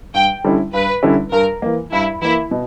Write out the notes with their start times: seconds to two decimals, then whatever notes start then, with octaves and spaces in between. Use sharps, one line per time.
0.14 G2 G5
0.44 D3 G3 C#4 E4
0.73 G2 B4
1.03 D3 G3 C#4 E4
1.32 G2 A#4
1.62 E3 A#3
1.92 G2 E4
2.21 E3 A#3 E4
2.51 B2